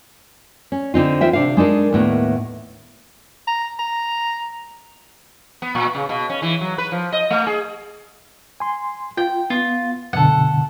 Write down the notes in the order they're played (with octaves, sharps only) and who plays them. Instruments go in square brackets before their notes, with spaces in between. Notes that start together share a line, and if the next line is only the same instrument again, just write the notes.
[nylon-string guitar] C#4
D3 C4 D#4 F4
E2 F4 C5 E5 G5
C3 D4 F5
G#3 D4 D#4 A4 A#4
D#2 A2 B3
[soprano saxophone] A#5
A#5
[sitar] B3
A#2
C#3
B2
C#4
E3
F#3
B4
F3
D#5
A3
G#4
[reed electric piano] G#5 C6
[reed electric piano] F4 [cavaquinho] G5
[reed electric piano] B3 [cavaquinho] F4
[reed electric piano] F#2 B2 D3 [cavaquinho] A4 F#5